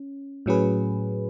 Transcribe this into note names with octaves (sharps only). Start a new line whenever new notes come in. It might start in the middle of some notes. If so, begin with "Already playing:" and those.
Already playing: C#4
A2 F#3 C#4 G#4 B4